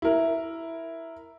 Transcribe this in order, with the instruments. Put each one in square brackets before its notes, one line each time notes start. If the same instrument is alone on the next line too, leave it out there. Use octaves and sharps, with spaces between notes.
[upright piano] E4 A#4